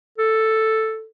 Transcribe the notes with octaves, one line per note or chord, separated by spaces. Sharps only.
A4